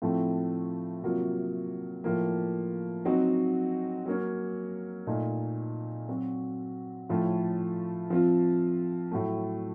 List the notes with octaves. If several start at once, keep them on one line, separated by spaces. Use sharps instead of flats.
A2 F3 A3 C4
C3 F#3 A#3 F4
A2 F3 A#3
F#3 C4 D#4 F#4
F#3 A#3 C#4
A#2 A3 D#4
F#3 C4 F#4
A2 F3 A3 C#4
F3 C4 F4
A2 F#3 A3